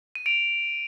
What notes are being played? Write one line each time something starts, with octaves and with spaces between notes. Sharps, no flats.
D#7
D7 F7